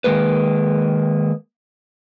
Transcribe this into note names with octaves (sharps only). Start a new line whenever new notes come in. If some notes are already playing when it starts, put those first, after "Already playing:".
D#3 G#3 A#3 B4